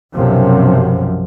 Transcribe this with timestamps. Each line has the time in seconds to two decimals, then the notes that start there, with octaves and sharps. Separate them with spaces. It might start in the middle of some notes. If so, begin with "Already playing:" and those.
0.15 B1 F#2 C3 F3